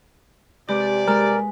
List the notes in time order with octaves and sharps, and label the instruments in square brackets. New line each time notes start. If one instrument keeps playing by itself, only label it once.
[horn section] C3 D5 [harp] G#3 B4 [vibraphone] G4
[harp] G#3 B4 [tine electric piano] A#4